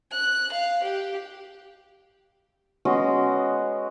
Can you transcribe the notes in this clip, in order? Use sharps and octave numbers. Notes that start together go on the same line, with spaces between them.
F#6
F5
G4
G#3 B3 C#4 F#4